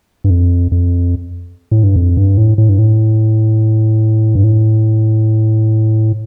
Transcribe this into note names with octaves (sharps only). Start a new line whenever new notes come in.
G2
F2
F2
A2
G2
F2
G2
A2
A2
G2
A2
G2
A2